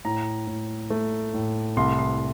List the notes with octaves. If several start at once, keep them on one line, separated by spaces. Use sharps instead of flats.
A2 A#5
A2
A3
A2
C2 C6
C6